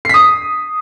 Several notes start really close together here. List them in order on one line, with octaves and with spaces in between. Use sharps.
C7 B6 D#6